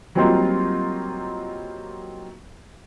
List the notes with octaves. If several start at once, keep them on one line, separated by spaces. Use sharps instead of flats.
F#3 G3 A#3 C4 D#4 F4